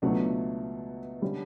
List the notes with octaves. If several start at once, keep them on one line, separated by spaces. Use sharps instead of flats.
C#2 B2 F#3 A3 D4
D3 G3 C#4